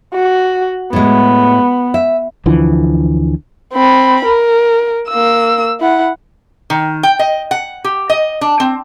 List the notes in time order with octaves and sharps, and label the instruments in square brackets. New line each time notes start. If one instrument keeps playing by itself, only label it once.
[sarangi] F#4
[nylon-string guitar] A2 G#3 [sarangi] B3
[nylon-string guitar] E5
[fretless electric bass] D2 D3 E3 F3
[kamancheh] C4 B5
A#4
A#3 E6
E4 F#5
[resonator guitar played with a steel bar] D#3
G5
D#5
F#5
G4
D#5
D4
C4